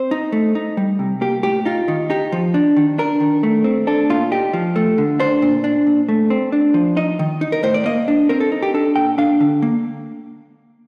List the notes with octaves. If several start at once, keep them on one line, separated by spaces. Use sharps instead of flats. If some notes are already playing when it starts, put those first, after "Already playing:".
Already playing: C4 C5
D#4
A3
D#4
G3
C3
A#3 G4
A2 G4
D#4 F4
D#3
D#4 G4
F3
D4
D#3
D4 A#4
D#3
A3
C4
D4 A4
A#2 F4
D#4 G4
F3
A3
D3
D4 C5
A#2
D4
A#2
A3
C4
D4
F3
D#4 D#5
D#3
D#4
A#4
A2 C5
D5
A#3 D#5
D4
C4 A#4
A4
D#4
G4
D4 A4
A#2 G5
D4 F5
D3
A#3